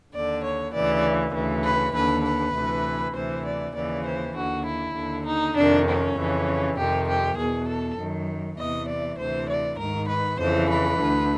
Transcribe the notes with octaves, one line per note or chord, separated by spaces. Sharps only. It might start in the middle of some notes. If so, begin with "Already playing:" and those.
D#2 D3 D5
C#5
D2 C#3 E3 D5
D2 C#3 E3
B4
D#2 D3 B4
B4
D2 C3 E3
D2 C3 E3 C5
D5
D#2 C#3 E3 D5
C5
D#2 D3 F#4
E4
D#2 D3
D#4
F2 C3 D#3 D4
C#4
F2 C#3 E3
F2 C3 D#3 G4
G4
E2 B2 G#4
A4
F#2 D#3
E2 C3 E3 D#5
D5
D2 C3 E3 C5
D5
G#2 D#3 A#4
B4
F2 C#3 E3 C5
B4
D2 D3